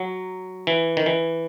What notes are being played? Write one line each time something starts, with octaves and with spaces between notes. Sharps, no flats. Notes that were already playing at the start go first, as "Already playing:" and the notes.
Already playing: F#3
E3
D#3
E3